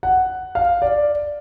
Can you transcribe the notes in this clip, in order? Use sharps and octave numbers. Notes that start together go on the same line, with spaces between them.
F#5
F5
D5